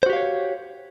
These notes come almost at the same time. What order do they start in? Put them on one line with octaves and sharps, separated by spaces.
C5 F#4 G4 F5 C#5